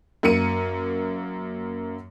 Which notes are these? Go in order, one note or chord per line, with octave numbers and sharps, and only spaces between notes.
F#2 A#3 C#7 D#7